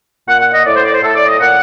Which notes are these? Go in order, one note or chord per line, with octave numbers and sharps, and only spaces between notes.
A#2 F#5
F#5
D#5
A2 D5
C5
D5
C5
A2 A4
D5
D#5
A#2 F#5